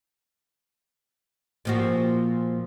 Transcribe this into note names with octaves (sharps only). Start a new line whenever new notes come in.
A#2 F3 F#4